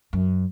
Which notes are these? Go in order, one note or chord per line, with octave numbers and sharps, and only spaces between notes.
F#2